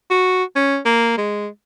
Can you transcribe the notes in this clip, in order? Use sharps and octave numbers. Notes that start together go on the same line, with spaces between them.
F#4
C#4
A#3
G#3